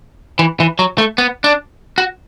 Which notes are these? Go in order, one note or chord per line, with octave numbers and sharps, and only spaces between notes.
E3
E3
F#3
A3
B3
D4
F#4